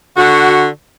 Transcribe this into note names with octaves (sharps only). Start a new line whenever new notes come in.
D3 F#4